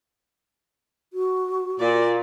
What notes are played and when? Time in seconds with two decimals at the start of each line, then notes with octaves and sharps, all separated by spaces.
1.13 F#4
1.80 A#2 D5